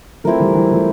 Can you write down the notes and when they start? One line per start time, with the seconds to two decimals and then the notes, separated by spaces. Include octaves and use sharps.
0.24 F3 A3 C4 E4 A#4
0.40 E3 G3
0.55 E3 G3
0.71 F3 A3